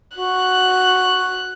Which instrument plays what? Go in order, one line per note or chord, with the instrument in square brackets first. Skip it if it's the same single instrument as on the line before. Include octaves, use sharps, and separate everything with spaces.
[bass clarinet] F#4 [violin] F#6